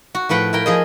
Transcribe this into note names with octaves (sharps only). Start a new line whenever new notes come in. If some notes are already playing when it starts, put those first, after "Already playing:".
F#4
A2 F3 B4 F#5 G5
E4 A#4 G5
F3 G#4 D#5